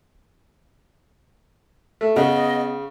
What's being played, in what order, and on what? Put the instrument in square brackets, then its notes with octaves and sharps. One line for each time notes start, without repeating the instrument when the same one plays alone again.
[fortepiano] A3
[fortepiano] C#3 [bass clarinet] B3 [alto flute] D#5